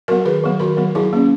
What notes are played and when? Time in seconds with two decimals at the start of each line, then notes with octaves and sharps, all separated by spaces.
0.08 F#3 B3 F#4 A#4
0.25 D#3 G#4 B4
0.43 F#3 B3
0.60 D#3 F#4 A#4
0.77 F#3 B3
0.95 F#3 E4 G#4
1.13 A#3 C#4